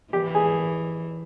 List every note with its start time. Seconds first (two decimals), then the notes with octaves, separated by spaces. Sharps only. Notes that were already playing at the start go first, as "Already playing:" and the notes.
0.13 E3 G4
0.35 G#4